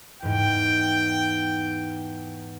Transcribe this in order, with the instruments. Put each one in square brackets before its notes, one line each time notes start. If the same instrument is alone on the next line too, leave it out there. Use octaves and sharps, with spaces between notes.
[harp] E2 G#2 [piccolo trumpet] G5